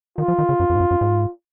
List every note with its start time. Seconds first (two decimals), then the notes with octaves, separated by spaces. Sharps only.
0.18 D#3 F4
0.28 F3
0.39 D#3
0.49 C#3
0.60 F#2
0.70 F2
0.76 G#2
0.81 F#2
0.91 F#2
1.01 G#2